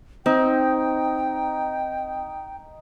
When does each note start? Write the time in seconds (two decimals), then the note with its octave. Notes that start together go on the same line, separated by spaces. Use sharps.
0.26 C4 D#4 G5